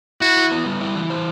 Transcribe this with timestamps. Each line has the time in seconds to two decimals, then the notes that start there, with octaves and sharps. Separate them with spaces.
0.21 E4 F#4
0.36 E3
0.51 B3
0.66 G3
0.81 E4
0.96 E3
1.10 C5